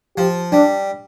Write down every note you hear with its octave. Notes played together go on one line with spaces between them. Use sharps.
F3 G4
G3 D4